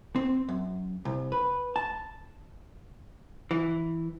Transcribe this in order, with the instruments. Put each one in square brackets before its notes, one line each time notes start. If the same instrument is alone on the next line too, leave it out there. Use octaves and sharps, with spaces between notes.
[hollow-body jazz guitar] C4
F#2
C2
B4
A5
E3